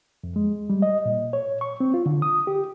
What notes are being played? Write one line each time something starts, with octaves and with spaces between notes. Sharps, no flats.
F2
G#3
G3
D#5
A#2
C#5
C#6
C4
F4
D3
D#6
G4